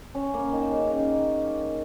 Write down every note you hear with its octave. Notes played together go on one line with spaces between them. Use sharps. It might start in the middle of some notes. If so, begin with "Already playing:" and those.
C#4
A#3
D#3
C#3
D#3